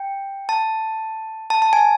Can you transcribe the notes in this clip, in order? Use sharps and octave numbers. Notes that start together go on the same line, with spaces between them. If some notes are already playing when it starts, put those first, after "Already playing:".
Already playing: G5
A5
A5
A5
G#5